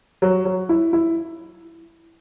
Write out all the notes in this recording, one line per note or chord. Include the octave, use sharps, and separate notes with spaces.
F#3
F#3
E4
E4